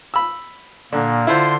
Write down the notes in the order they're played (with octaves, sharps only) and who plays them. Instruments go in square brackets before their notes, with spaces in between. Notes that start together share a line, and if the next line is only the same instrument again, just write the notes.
[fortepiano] B5 E6
[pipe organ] A#2 A#3 [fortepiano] D3
[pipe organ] D3 C6 [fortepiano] E4 F4 C5